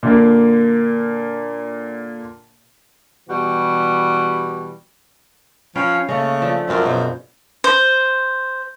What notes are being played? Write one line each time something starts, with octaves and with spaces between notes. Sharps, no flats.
A#2 D3 A#3
B2 E3 G3 F#4 G4
F3 C#4 B4 C#5 F5 G5
C#3 A3 A#3 C#4 D#5
F3 D4
F#2 C4 F4 A#4
B2 G#4 C5
C5